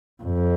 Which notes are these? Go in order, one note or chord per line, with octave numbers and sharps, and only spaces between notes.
F2